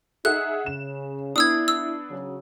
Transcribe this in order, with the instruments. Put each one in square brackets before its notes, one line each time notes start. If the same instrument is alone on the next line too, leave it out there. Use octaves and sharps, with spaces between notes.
[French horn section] D#4 [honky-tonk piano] G#4 E5 F#5 [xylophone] F#6
[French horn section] C#3 [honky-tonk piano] E7
[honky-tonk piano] B3 D4 [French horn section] E4 [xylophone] D#6 E6 G#6
[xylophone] E6
[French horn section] C#3 F#3